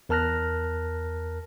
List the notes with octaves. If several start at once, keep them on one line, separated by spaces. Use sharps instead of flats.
E2 A#4 A5 F6 F#6 A#6